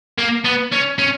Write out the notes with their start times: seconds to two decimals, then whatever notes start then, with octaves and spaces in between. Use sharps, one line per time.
0.19 A#3
0.45 B3
0.73 C#4
0.99 C#4